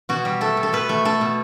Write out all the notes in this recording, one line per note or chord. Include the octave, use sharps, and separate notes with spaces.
B2 F#4
G3
A3 A4
B2
A4
B2 B4
A3
A3 A4
B2